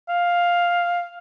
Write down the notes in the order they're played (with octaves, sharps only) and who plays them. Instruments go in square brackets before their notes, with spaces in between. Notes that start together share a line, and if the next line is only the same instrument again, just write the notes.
[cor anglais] F5